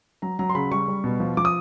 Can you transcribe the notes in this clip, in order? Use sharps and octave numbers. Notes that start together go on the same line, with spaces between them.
F#3 A#5
F#3 A#5
C6
C#3 B5
G3 C#6
G3
B2
F3
F3 D6
D#6